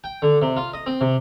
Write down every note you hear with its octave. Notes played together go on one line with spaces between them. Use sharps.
G5
D3
C3
F4
D#5
C4
C3